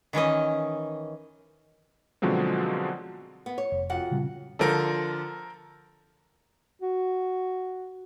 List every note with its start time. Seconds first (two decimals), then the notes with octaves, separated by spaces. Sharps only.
0.13 D#3 E3 C#4 D#5
2.22 B2 D3 F3 F#3 G#3 C4
3.46 B3
3.58 C#5
3.72 F1
3.90 F2 F#4 F#5
4.11 A#2 C#3 G3
4.59 D3 F3 A4 A#4 C5
6.81 F#4